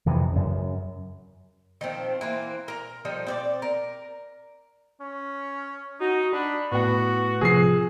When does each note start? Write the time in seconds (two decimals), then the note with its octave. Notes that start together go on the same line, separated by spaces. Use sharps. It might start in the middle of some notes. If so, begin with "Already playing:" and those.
0.06 F2 C3 E3
0.32 F#2 C#3
1.81 D#3 F3 C4
2.21 E3 A#3 C4
2.68 A#4 A#5
3.05 F3 G3 D#4 A4
3.27 C4 C#5 D5
3.62 A#4
5.01 C#4
6.00 D#4 F#4
6.33 D4 B5
6.72 A2 B3 F#4 F#5
7.41 C3 F3 G#4 E6 A#6 C7